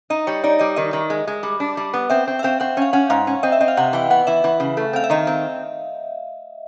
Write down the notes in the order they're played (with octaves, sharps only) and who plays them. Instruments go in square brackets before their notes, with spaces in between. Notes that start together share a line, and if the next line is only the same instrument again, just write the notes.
[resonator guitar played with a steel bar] D#4 [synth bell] D#5
[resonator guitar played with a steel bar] G3 [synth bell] C#5
[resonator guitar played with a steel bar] D#4 [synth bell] D5
[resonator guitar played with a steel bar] G3 [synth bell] D#5
[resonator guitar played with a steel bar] D#3 [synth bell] D#5
[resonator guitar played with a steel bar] D#3
G#3
G#3
G3
D4
G3
B3
[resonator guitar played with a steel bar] C4 [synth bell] E5
[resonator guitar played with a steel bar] C4
[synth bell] E5
[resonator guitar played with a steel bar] C4 [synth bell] F5
[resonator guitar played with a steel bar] C4 [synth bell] F#5
[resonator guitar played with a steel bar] C#4 [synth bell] F5
[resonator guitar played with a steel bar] C#4 [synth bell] F#5
[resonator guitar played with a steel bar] G#2 [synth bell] F5
[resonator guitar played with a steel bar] C#4
[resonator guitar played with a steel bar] C4 [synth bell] D#5
[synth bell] E5
[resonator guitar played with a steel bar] C4 [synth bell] D#5
[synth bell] F5
[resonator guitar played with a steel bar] C3 [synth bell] F#5
[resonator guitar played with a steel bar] E3 [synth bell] G5
[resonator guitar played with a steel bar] B3 [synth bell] F#5
[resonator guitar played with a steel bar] E3 [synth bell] E5
[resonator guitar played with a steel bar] E3
C#3
A3
[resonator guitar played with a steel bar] C4 [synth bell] F5
[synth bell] E5
[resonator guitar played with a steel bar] D#3 [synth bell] D#5
[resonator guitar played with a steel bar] C4